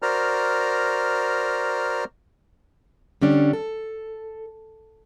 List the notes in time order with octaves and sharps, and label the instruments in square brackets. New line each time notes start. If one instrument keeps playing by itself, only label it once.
[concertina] F#4 A#4 C5 D5 A#5 F6
[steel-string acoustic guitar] D3 G3 C#4 D4
A4